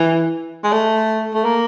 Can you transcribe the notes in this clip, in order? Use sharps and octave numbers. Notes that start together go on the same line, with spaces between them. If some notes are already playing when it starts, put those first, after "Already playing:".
Already playing: E3
G#3
A3
A3
A#3